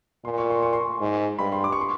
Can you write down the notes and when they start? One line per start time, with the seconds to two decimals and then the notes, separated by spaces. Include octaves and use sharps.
0.25 A#2 C6
0.38 C#6
0.50 C6
0.62 C#6
0.73 C6
1.01 G#2
1.39 G2 B5
1.52 C6
1.64 D6
1.72 C#6
1.81 C6